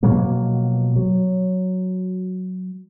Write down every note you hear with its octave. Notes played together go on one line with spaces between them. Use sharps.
B2 F3 F#3 A#3
F#3